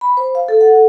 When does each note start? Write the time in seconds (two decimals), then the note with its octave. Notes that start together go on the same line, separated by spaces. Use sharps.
0.01 B5
0.17 C5
0.35 F5
0.48 A4
0.61 F#5
0.73 A4